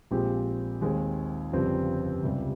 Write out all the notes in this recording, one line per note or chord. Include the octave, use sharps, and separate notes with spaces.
A#1 A#2 G#3 C4 G4
D#2 D#3 G#3 C4
G1 F2 C#3 G3 C4
C#2 C3 G3